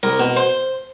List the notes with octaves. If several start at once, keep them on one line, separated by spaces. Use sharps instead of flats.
C2 A#4
B2
C5